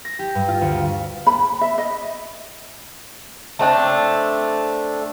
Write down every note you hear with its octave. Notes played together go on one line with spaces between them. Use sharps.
A#6
G4
G2
F4
D2
B5
E5
D#5
A3 C4 D4